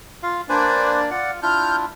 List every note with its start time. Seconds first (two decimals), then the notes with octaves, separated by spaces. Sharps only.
0.23 F4 F5
0.49 A#3 D4 B4 C5 D5 G#5
1.11 F4 D5 F#5
1.42 D4 E4 F4 F6 G6